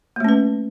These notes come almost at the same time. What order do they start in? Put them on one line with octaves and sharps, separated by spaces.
A#3 A3 C#4 B4